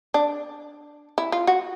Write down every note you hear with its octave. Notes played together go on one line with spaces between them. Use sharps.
D4
E4
F4
F#4